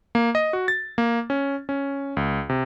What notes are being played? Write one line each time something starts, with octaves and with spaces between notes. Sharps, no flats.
A#3
D#5
F#4
A6
A#3
C#4
C#4
C#2
C3